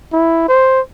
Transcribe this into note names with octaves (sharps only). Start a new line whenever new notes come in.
E4
C5